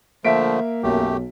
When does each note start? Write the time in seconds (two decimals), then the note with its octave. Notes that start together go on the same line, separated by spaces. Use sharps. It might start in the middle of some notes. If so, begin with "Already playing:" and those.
0.25 D3 F3 A3 A#3 E5 B6 D7
0.83 B1 F#2 A3 G4